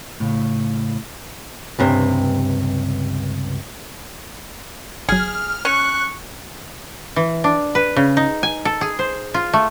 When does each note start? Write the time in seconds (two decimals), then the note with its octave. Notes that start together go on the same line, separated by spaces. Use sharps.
0.20 A2 C#3
1.79 C#2 G2 C3
5.09 G1 F#3 G#4 F6
5.65 C#4 C#6 F#6
7.16 E3
7.44 D4
7.75 B4
7.96 C#3
8.17 D#4
8.43 G#5
8.65 A4
8.81 G#4
8.99 C5
9.34 F4
9.53 A3